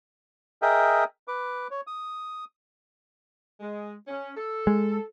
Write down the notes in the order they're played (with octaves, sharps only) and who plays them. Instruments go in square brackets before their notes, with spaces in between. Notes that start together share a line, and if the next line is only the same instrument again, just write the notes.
[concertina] G#4 A#4 D#5 E5 G5
B4 D6
C#5
D#6
[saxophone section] G#3
C#4
A4
[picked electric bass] G#3